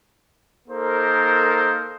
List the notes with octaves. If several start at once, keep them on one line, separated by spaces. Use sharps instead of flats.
A#3 D#4 A4 A#4 C5